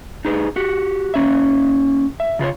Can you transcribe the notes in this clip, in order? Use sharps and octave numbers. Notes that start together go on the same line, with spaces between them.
D#4 G#4 B4
F#4 G4
A#3 C#4 E5
E5
C#3 F4 B4 C#5